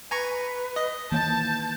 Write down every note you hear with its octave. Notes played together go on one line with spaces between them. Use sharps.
B4 G#5 A#5 C#6
D#5
D#3 E3 A#3 A5 G6